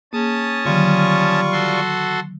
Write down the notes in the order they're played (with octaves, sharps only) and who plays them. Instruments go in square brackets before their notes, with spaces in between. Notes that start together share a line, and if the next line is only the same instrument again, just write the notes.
[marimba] A#3 G#4 [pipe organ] C#4 A5 D#6
[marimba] D3 D#3 F#3 [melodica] G3 F4 C#6
[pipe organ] F#4 A4 C6